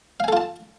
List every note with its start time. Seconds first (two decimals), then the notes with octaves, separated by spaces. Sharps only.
0.20 F5
0.24 G#5
0.28 A4
0.33 F4
0.37 A5